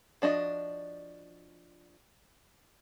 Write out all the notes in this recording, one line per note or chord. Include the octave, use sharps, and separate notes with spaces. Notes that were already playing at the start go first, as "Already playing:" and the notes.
F3 D4 F#4 D#5